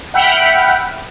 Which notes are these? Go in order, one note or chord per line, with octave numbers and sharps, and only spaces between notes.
E5 F#5 G5 B5 F6